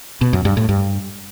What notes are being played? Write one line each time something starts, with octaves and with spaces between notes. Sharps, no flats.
B2
F#2
G2
A2
G2